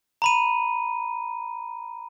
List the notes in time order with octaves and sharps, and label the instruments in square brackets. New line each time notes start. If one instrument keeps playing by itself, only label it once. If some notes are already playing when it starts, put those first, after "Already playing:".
[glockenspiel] A#5 B5 D#7